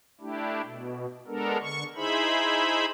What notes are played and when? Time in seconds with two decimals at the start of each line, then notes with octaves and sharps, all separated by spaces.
0.21 A3 D4 E4 G4
0.64 B2
1.27 G#3 B3 D4 A4 A#4
1.61 D3 C#6
1.96 D#4 E4 G#4 C5 E5 B5